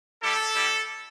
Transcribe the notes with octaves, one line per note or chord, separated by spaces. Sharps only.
G3 E4 G4 A4
G3 E4 G4